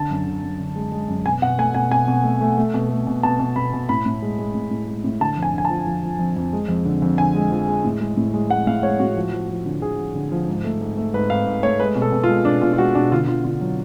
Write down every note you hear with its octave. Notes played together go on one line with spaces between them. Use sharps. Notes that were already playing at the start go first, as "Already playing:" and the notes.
Already playing: D3 A5
F#2
D3
F#2
D3
G#3
G#3
F#2
B2 G#5
B2 F#5
A3 G#5
B2 G#5
B2 G#5
B2
A3
A3
A3
B2
A3
B2
B2 A5
B2
B2 B5
B2
A2 B5
A2
G#3
G#3
A2
A2
G#3
A2
D3 A5
F2
G#5
D3 G#5
A5
F3
F3
F3
F2
F2
G#3
F2
D3
F2
D3 G#5
G#3
F3
G#3
A2
G#3
A2
G#3
G#3 F#5
A2 F5
G#3 C#5
A2 F#4
F3
F3
F3
D3
D3 G#4
F3
D3
F3
G#2
A3
G#2
A3
G#2 B4
G#2 F5
G#2
A3 C#5
G#3 B4
B2
A4
B2
F4
G#3
B2 D4
B2 F4
F4
G#3 F#4
B2 D4
D3 F4
D3 F4
D3 F4
F#3